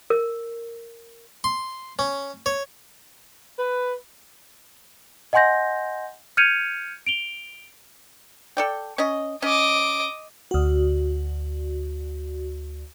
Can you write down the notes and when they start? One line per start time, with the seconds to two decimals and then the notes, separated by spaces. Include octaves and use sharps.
0.10 A#4
1.44 C6
1.99 C#4
2.46 C#5
3.59 B4
5.33 D#5 F#5 G#5 C6 G6 A#6
6.37 F6 G6 G#6 C#7 D#7 F7
7.07 D7 F7 G7
8.57 A4 D5 G5
8.98 C#4 D#5
9.42 C#4 D#5 D6
10.51 D2 F#4